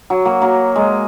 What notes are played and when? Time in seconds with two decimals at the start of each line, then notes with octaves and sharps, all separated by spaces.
0.10 F#3
0.25 F#3 A#3
0.42 F#3 A#3
0.76 G#3